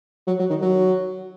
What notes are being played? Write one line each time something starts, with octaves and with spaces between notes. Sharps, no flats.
F#3
F#3
D#3
F#3